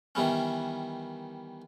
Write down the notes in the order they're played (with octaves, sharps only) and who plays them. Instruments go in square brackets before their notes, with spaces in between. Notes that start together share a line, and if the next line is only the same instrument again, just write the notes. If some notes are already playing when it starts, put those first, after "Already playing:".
[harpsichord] D#3 E3 G3 B3 C#4